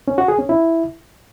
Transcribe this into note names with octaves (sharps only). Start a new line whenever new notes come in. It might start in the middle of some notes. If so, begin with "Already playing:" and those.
C#4
F#4
G#4
C#4
E4